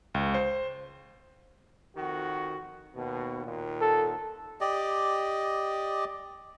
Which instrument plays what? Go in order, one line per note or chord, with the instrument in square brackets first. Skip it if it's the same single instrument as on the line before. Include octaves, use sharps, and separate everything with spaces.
[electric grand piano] C#2
C5
[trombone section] F2 D#3 F#4
D#2 B2
D#2 A#2
[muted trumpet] A4
[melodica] G4 D5 D#5